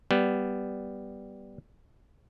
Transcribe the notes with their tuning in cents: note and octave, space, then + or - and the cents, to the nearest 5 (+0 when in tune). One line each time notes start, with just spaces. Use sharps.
G3 +0 B3 +0